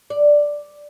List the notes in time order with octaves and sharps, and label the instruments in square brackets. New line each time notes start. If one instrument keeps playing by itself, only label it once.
[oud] D5